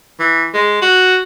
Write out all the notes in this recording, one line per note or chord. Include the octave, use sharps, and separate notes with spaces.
E3
G#3
F#4